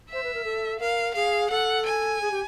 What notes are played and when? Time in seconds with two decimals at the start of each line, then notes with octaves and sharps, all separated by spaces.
0.10 C5 E5
0.24 B4
0.34 A#4
0.45 A4
0.80 A#4 F5
1.15 G#4 F5
1.51 A4 F#5
1.86 G#5
2.22 G#4
2.31 G4